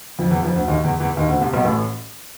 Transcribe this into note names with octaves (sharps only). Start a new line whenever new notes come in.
F2 F3
E2 E3
F2 F3
D2 D3
D#2 D#3
E2 E3
E2 E3
D#2 D#3
D2 D3
C2 C3
B1 B2
A1 A2